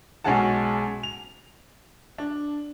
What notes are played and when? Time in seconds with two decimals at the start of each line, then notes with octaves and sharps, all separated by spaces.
0.24 B1 G#3 C#4 G#4 F#5 A5
1.03 F7
2.18 D4